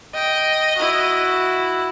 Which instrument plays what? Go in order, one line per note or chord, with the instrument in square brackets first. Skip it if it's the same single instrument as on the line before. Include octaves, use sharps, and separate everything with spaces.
[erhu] D#5 [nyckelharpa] G5
[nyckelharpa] E4 F#4